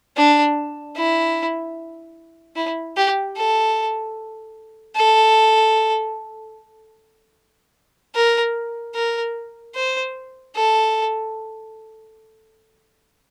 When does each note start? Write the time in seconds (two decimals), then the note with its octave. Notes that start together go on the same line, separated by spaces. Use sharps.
0.17 D4
0.96 E4
2.56 E4
2.97 G4
3.37 A4
4.96 A4
8.15 A#4
8.95 A#4
9.75 C5
10.56 A4